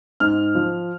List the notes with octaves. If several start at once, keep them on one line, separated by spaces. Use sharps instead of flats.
G#2 F6
F3